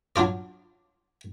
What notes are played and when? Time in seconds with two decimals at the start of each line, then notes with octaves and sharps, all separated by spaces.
0.16 F#3 D4 F4 D5